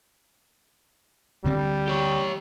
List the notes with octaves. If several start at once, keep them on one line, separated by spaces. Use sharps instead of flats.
D2 D3 G3 C4
G4 C#5